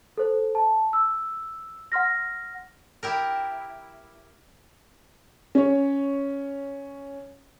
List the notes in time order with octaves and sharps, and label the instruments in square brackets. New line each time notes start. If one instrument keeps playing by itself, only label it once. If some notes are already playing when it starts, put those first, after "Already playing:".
[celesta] A4 C5
A5
E6
F#5 C6 F6 A#6
[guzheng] E4 G4 A#4
[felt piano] C#4 C#5